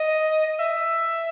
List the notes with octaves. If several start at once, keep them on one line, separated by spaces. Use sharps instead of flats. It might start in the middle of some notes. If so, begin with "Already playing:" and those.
Already playing: D#5
E5